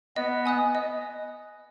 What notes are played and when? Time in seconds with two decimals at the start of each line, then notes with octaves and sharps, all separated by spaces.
0.16 B3 D#5
0.46 G#5 D#6 F#6
0.75 D#5